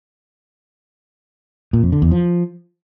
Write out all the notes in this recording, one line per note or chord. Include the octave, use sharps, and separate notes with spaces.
A#2
F2
D3
E2
F3